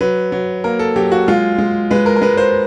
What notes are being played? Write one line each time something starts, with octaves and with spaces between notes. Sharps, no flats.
F#3 B4
F#3
A#3 A#4
A4
F#3 G4
F#4
G#3 F4
G#3
G#3 B4
A#4
A#4
G#3 B4
C5